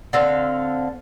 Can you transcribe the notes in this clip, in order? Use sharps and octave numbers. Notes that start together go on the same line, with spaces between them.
D3 C4 F5